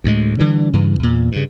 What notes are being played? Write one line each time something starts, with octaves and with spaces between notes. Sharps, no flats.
D2 A2 G#3
D3 E3 G3
G2 C#3 E3
E2 A#2
G2 C#3